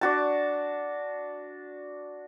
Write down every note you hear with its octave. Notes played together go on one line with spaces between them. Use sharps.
D4 F#4 A5